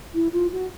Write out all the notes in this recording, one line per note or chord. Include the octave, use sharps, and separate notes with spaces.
E4
F4
F#4